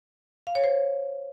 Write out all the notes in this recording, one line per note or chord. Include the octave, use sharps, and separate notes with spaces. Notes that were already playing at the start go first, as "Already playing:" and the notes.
F5
C#5
C5